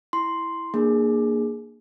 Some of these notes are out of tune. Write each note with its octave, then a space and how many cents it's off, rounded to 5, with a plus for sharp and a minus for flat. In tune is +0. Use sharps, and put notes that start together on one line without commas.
E4 +0 C6 +0
A#3 +0 D4 +30 G#4 +0